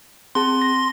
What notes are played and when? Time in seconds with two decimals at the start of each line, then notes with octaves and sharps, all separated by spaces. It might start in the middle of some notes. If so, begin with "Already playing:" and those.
0.35 C4 G#4 A5 C6
0.62 A#6